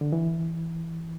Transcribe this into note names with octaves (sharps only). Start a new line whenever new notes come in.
D3
E3